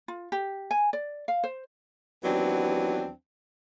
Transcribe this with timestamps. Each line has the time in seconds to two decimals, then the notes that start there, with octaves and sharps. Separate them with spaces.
0.08 F4
0.32 G4
0.71 G#5
0.93 D5
1.28 F5
1.44 C5
2.24 D#2 E3 F#3 B3 C4 D4